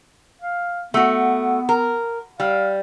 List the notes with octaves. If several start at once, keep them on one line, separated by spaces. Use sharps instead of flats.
F5
A3 B3 F#4
A#4
G3 F5